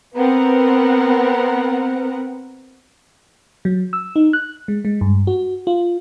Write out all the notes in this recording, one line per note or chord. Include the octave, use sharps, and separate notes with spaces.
B3 C4 A#4 F#5
F#3
E6
D#4
F#6
G#3
G#3
G2
F#4
F4